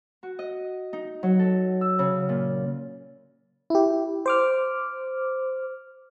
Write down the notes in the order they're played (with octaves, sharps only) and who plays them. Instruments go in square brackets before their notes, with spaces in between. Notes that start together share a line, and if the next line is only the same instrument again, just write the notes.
[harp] F#4
D#5
D#4
F#3
A4
E6
C#3
A#2
[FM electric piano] E4 G4
C5 D6 F6